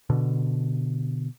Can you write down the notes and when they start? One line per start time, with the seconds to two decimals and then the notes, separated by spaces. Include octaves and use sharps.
0.10 B2 D3